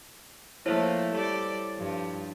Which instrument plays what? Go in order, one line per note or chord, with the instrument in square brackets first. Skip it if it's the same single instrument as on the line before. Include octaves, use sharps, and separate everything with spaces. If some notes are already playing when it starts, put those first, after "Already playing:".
[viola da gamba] F3 A3 A#3 [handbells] E4 C5 C#5
[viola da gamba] G3 A4 D5
G2 F3